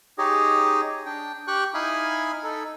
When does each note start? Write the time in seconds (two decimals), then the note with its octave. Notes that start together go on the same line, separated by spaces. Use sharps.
0.18 D#4 G4 G#4 C#5 D#5
1.06 D4 G5
1.47 G4 G5 C#6 F#6
1.74 D#4 E4 F5 G#5 B5 D#6
2.43 D#4 A4